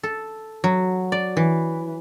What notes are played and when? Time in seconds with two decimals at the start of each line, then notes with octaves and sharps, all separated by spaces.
0.03 A4
0.64 F#3
1.12 D5
1.37 E3